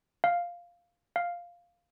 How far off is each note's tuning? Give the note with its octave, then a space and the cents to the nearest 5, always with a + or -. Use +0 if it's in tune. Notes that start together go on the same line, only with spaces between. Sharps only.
F5 +0
F5 +0